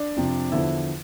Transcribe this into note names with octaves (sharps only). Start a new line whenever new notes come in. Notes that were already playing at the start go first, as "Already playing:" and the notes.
Already playing: D4 D5
F2 C3 F3
E2 D3 F3 E4 E5